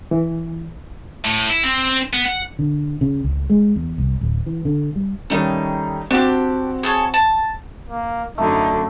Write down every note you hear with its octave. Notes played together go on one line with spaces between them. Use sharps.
E3
A2
E4
C4
B3
F#5
D3
C#3
C#2
G#3
E2
C2
D1
E3
D3
G3
D#3 G3 A3 C#4 D#4
C4 D4 F#4 G4
G#4 A4 C#5
A5
A#3
F#2 D3 A3 D#4